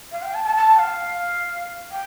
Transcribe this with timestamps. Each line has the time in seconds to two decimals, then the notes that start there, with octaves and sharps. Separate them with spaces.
0.12 F5
0.22 G5
0.34 A5
0.45 A5
0.56 A5
0.74 G5
0.79 F5
1.91 G5